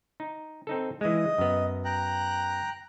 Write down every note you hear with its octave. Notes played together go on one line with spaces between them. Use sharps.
D#4
C4 D#4 A4
E3 G#3 D#5
F#2 B3
G5 A#5 F#6